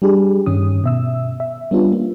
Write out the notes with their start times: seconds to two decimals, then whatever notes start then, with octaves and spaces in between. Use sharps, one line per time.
0.02 G3 D4 G4 G#4
0.46 G2 D#3 C#4 D#6
0.84 B2 E5 E6
1.40 E5
1.71 G3 B3 C#4 D4 F4
1.92 A#3